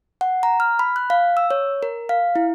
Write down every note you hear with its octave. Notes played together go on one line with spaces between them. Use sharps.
F#5
A#5
F6
B5
F#6
F5
E6
C#5
A#4
F5
E4